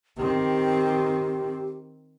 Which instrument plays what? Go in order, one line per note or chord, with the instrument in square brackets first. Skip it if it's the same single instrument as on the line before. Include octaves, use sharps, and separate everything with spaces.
[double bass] D#3 C4 [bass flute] G4